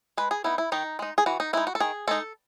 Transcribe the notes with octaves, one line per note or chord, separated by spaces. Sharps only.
G#3 B4
G#4
B3 D#4 E4
E4
D#3 D#4
G#3 D#4
G#4
E3 F#4
D#4
G#3 D#4 E4
F#4
A4
D#3 G#4
G#3 D#4 A4